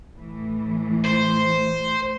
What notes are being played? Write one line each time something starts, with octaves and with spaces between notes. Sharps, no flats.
A2 E3
C5